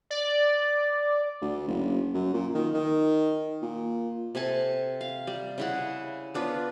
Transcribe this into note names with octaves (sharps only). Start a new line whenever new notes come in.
D5
D2
F#1
F#2
A#2
D#3
D#3
A#2
C3 A4 G#5 A5
F5
G3
C#3 E4 F#5
B3 D4 F4 B4